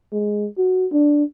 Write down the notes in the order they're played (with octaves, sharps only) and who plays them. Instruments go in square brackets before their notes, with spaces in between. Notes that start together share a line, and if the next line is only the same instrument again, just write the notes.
[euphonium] G#3
F#4
D4